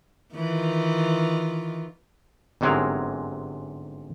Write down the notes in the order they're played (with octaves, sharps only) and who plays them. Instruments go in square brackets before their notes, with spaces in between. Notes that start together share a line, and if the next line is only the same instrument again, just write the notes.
[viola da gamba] D#3 E3 F4
[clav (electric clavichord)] G1 G#2 C3 F#3 G#4 A#4